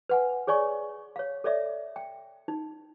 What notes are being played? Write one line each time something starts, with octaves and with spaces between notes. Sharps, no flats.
B4 F#5 G#5
G#4 C#5 D5 G#5 C#6
C#5 F5
A4 C#5 D5 E5
G5
D#4